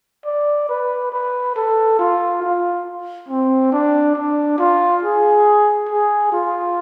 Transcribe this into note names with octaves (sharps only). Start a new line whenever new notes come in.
D5
B4
B4
A4
F4
F4
C4
D4
D4
F4
G#4
G#4
F4